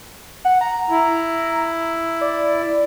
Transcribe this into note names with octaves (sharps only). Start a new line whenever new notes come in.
F#5
A#5
E4
D5